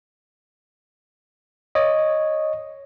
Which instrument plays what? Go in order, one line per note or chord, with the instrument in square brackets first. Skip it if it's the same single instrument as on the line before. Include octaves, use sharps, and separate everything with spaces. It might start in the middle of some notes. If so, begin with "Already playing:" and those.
[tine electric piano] C#5 D#5